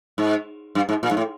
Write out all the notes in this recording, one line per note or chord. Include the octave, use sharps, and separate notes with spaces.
G#2
G2
G#2
A#2
G#2
A2